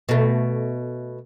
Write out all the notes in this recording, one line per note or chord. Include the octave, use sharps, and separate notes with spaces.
B2 A3